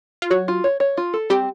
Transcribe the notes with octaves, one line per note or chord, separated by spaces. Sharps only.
F4
F#3 F#4 C#5
F4
C#5
C#5
F4
A4
G3 C4 G4